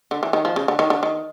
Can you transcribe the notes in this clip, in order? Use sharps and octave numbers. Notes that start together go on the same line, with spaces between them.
D3
E3
D#3
F3
C#3
D3
D#3
D3
D#3